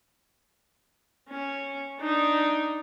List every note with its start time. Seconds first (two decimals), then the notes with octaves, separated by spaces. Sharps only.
1.30 C#4
2.00 D4 D#4